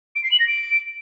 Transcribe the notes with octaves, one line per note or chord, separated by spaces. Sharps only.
D7
C7
F#7
A#6
D7